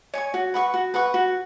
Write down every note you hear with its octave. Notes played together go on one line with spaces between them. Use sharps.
C#5 G#5 C#6
F#4
B4 F#5 C#6
F#4
B4 F#5 C#6
F#4